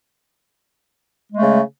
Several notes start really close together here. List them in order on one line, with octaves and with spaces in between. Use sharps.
G#3 A3 C#3